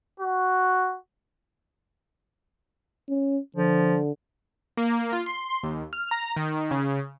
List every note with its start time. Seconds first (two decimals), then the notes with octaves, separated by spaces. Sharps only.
0.20 F#4
3.09 C#4
3.56 D3 F3
4.77 A#3
5.13 F4
5.26 C6
5.63 D#2
5.93 F6
6.11 A#5
6.36 D#3
6.71 C#3